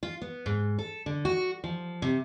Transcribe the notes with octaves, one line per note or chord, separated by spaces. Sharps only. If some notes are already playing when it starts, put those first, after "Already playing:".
F4
B3
G#2
A4
D3
F#4
F3
C3